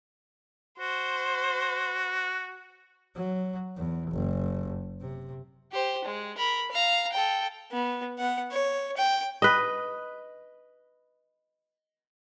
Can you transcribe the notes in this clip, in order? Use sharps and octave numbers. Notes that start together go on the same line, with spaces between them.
F#4 C5
F#3
E2
F#1
C3
G4 C5
G#3
A#4 B5
F5 A#5
A4 G5
B3
B3 F#5
C#5
G5
B4 D#5